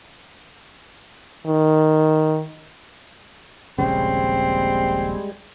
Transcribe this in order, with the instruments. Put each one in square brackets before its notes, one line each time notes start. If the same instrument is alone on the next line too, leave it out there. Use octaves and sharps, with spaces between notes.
[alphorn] D#3
[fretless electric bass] D#1 A#1 C#3 [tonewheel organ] G3 G#3 [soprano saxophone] C4